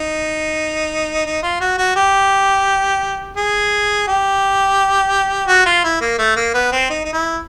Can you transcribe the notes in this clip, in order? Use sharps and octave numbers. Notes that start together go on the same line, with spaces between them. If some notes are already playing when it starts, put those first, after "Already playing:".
Already playing: D#4
D#4
F4
F#4
F#4
G4
G#4
G4
F#4
F4
E4
A#3
A3
A#3
B3
C4
D#4
D#4
E4